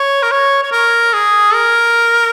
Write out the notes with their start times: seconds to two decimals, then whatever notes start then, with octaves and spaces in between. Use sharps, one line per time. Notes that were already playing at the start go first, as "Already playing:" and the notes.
Already playing: C#5
0.23 A#4
0.32 C#5
0.63 C#5
0.72 A#4
1.13 G#4
1.54 A#4